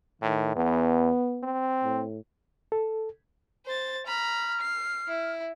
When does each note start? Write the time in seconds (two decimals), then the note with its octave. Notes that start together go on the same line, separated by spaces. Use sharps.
0.22 A2 D#3
0.56 E2 B3
1.43 C4
1.84 A2
2.72 A4
3.66 C5 A6
4.07 A#5 B5 F6
4.61 C7
5.08 E4